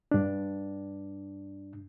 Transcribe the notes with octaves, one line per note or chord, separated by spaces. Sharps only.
G2 D4